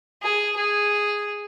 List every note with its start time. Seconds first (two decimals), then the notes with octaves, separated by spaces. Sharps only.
0.23 G#4
0.57 G#4